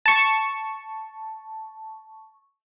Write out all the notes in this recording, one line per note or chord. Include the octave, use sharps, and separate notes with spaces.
A5 C#6